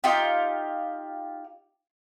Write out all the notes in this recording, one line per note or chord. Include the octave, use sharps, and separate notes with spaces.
D#4 F4 G4